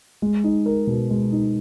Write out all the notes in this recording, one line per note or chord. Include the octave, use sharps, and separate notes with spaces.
G#3
D#4
A#4
B2
G#3
D#4